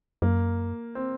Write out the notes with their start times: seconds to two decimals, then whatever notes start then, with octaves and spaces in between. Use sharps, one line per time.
0.22 F#2 A#3
0.95 C4